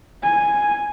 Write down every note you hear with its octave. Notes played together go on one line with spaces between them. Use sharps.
G#5